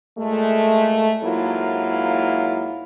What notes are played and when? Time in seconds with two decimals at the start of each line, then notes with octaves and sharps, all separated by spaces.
0.18 A#2 G#3 A3
1.23 G#2 F#3 A#3 E4 F4